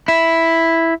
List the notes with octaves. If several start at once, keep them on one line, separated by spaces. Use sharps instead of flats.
E4